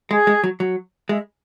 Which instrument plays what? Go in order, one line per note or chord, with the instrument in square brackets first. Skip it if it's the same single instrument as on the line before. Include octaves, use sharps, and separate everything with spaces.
[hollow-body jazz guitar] G#3 [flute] G#4
[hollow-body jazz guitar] G#3
F#3
F#3
[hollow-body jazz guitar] G#3 [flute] E5